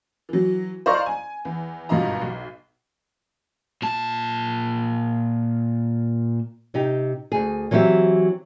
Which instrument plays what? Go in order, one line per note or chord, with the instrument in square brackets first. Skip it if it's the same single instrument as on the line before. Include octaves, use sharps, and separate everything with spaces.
[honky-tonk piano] E3 F#3
C5 D5 D#5 F5 A#5 C#6
G#5
E2
G#1 G2 B2 F4 D#5 A#5
B1
[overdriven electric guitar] A#2 A5
[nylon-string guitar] C3 D#4 G4
D2 G#4
E3 F#3 C4 G4 E5